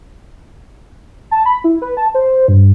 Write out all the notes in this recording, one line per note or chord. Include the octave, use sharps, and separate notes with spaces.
A5
B5
E4
B4
A5
C5
G2